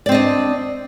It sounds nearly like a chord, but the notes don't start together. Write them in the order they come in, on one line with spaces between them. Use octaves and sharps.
D5 C4 D#5 D4